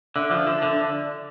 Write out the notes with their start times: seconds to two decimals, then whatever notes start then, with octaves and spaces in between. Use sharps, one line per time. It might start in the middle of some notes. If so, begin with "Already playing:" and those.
0.15 D3 D5 E5
0.31 F3
0.47 D3
0.62 D3